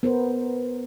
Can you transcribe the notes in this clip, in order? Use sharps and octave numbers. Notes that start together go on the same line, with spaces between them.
B3 A#4 C5